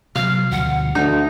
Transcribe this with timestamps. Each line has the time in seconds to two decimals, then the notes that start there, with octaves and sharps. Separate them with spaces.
0.16 C3 F#3 F5 F6
0.51 D2 B2 F3 F#5
0.95 D2 D4 D#4